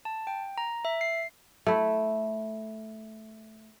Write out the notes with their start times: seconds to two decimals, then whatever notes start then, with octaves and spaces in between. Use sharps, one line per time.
0.05 A5
0.27 G5
0.58 A#5
0.85 E5
1.01 C7
1.67 A3 E4